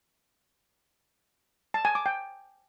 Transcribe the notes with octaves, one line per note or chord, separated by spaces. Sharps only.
A5
G#5
D6
G5